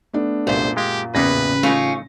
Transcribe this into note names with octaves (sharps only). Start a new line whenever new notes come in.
A3 B3 D4
C2 F#2 A#2 C5
G#3 G4 F5
A1 E2 C#3 A#3 B3 B4 A#6
A3 C#4 D#4 F4